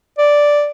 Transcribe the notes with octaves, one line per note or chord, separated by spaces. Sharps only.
D5